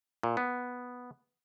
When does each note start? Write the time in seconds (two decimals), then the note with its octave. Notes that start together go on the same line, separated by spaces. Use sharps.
0.23 A#2
0.37 B3